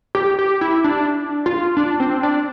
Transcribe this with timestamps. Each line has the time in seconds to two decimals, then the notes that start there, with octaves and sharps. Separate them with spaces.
0.15 G4
0.39 G4
0.61 E4
0.84 D4
1.46 F4
1.77 D4
2.00 C4
2.23 D4